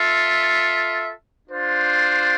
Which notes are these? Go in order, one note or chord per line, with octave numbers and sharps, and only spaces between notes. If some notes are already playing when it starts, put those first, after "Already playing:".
Already playing: F4 A4 E5
D4 F4 C5